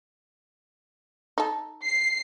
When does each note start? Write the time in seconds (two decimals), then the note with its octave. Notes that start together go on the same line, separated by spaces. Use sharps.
1.38 D#4 A4
1.84 C7